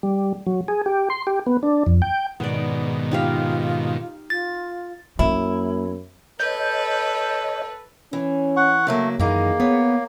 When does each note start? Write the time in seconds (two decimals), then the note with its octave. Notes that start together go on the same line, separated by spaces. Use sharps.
0.03 G3
0.47 F#3
0.68 G#4
0.86 G4
1.10 C6
1.27 G4
1.46 B3
1.63 D4
1.87 F2
2.02 G5
2.40 G#2 B2 D#3 B3 D5
3.11 D#4 F4 G4 F5
4.30 F4 A6
5.19 F#2 A#3 E4
6.40 A4 B4 C#5 D#5 G6
8.13 E3 C#4
8.57 F#5 C#6
8.87 C#3 F#3 A3 A#3
9.19 F#2 D#3 E3 A#3 D#4 G#4
9.60 B3 C#5